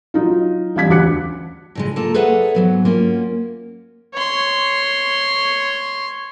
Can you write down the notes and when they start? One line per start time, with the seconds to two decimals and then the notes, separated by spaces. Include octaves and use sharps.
0.14 F#3 D#4 F4
0.76 A1 G3 F5 G#6 B6
0.89 E1 D2 D6 F#6 C#7
1.75 A2 C#3 G#3
1.96 A#3 F4 A4 A5 A#5
2.14 G#4 A4 B4 C#5 E5 F#5
2.55 G#2 F#3 B3
2.85 A#3 C#4 F4 F#4
4.14 C#5 C6